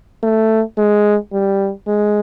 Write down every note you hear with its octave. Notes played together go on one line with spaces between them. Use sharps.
A3
G#3
G3
G#3